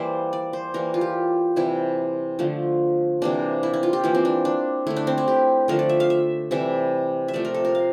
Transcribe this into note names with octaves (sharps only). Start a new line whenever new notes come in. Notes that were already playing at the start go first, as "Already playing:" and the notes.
Already playing: E3 G3 A#3 C5 D5 E5
D5
C5
E3 G3 A#3 A#4
F4
G4
C3 E3 G3 E4
D3 F3 A3
C3 E3 G3 A#3 D4
E4
E4
F4
G4
E3 A#3 E4
C4
D4
D4
D3 A3 E4
D4
C4
E4
G4
D3 F3 A3 A#4
D5
E5
F5
E5
C3 E3 G3 E5
E5
C3 F3 A3 D5
A#4
A4
A#4
F5